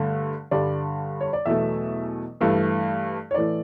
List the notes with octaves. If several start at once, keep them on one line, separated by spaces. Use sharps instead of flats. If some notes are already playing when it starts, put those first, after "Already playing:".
Already playing: G2 D3 A3
G2 D3 G3 D5
C#5
D5
E2 B2 F#3 A3 E5
G2 E3 A3
C#5
A2 E3 A3 D5